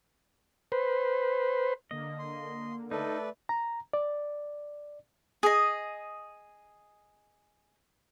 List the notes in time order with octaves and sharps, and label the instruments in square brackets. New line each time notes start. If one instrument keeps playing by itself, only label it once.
[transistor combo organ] B4 C5
[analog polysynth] D3 A#3 [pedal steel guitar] D#5
[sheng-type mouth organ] C6
[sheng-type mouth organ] A3 B4 D5 [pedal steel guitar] D#4 [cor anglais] A4
[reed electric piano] A#5
D5
[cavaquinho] G#4 D#5